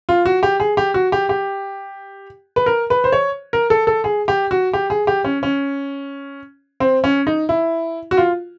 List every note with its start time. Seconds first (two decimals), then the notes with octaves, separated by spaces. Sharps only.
0.09 F4
0.26 F#4
0.43 G4
0.60 G#4
0.77 G4
0.94 F#4
1.12 G4
1.29 G4
2.56 B4
2.66 A#4
2.90 B4
3.04 C5
3.12 C#5
3.53 A#4
3.70 A4
3.87 A4
4.04 G#4
4.28 G4
4.51 F#4
4.73 G4
4.90 G#4
5.07 G4
5.24 C#4
5.43 C#4
6.80 C4
7.04 C#4
7.27 D#4
7.49 E4
8.11 F#4
8.17 F4